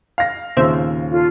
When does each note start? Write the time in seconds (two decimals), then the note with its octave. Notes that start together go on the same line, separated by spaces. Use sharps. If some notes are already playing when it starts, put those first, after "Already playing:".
0.18 F5 A#6
0.57 D#2 A#2 C#3 C4 E5
1.11 F4 A4 C#5